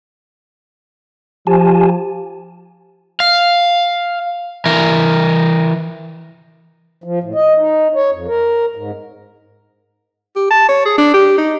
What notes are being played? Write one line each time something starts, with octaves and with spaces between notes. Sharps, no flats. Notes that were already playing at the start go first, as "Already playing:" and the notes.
F3 G4 G#5 A5
F5
E3 A#4
F3
A2
D#5
D#4
C#5
F2
A#4
G#2
G4
A5
C#5
G#4
D4
G4
D#4